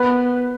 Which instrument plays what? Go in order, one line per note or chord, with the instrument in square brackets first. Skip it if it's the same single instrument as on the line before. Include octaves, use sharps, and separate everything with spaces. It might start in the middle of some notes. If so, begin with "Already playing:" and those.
Already playing: [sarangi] B3 [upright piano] B4